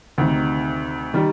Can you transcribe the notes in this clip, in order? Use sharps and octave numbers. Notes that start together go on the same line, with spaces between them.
D2 C3 D#3
D#3 G3